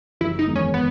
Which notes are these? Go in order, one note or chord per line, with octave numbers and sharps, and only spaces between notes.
F#1 E4
D#4
E2 D#3 G#3 B3
C#4
B3